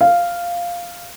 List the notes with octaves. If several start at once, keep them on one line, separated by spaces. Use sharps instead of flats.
F5